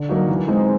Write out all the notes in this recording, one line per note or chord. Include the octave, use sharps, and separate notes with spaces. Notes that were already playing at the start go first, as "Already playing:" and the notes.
Already playing: D3
F#3 A#3 D#4 F#4
E3
G#3 C4 D#4